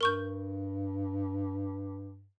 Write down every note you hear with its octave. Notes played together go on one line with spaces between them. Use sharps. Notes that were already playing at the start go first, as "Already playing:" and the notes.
G2 A#4 C#6 G6